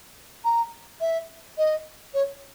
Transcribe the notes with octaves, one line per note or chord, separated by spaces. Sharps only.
A#5
E5
D#5
C#5